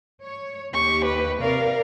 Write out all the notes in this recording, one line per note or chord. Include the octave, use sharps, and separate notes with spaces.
C#5
D#2 G4 C#6
B4
C3 A#4 D5 F5